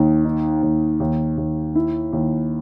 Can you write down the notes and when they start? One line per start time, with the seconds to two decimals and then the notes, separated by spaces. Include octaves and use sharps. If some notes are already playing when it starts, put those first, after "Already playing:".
Already playing: D#2 D#4
0.24 D#4
0.63 D#2
1.00 D#2
1.37 D#2
1.75 E4
2.13 D#2